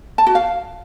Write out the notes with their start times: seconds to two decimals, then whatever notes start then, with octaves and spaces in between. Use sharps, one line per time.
0.18 A5
0.27 F#4
0.35 F5